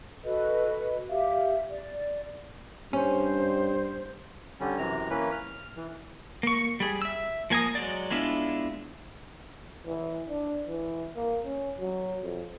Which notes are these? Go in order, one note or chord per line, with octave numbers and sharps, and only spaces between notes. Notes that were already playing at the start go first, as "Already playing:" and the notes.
F#4 A4 B4 D#5
G4 E5 F5
D5
G2 C#4 C5
D3 G3 C#4
F#2 C3 E3 A#5
E3 A#3 C#4 B4
F6
E3
A#3 C#6
G3 G#4
E5 E6
F3 A#3 G#5 A#5 D#6
F#3 G#3 D5
G#3 B3 D4 E4 F4
E3
D4
E3
A#3
C#4
F#3
F2